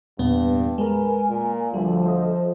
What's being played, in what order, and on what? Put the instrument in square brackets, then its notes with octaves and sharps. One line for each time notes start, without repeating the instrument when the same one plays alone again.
[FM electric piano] E2 A#2 B3 [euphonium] G2
[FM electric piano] G#3 A#4 [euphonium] B4 [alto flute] G#5
[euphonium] A#2
[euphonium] D2 [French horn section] F3 [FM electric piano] G3 [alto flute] A4
[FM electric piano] C5 D#5